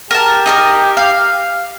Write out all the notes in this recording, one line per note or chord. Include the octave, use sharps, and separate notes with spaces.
G4 A#4 A5
D#4 A4 A#4
F5